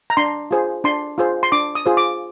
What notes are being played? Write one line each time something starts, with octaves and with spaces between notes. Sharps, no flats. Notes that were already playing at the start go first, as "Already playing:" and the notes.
A#5
D4 C6
F4 G#4 C5
D4 C6
F4 G#4 C5
C6
D4 D6
D#6
F4 G#4 C5
D6